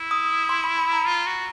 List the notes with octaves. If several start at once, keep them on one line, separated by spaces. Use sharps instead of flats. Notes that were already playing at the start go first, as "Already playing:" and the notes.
Already playing: E4
D#6
C6
B5
B5
A#5
F4
F#4